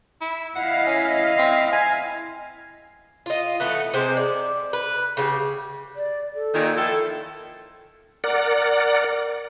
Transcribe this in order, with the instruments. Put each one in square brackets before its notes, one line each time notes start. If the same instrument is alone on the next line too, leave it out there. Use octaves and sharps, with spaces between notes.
[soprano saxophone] E4
[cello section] E4 D#5 F5 [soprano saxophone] F#5
[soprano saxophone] C#4
C4
G#5
[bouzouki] F4 D#5
E3 A3 B3
C3 G#3 G4 C5
D5
B4
C#3 F3 G3
[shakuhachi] D5
A4
[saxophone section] A#2 D#3
[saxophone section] F3 E4 A4 [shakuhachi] G5
[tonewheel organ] A#4 D5 F#5